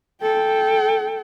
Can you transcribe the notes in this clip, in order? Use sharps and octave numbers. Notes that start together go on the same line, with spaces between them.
A4 G5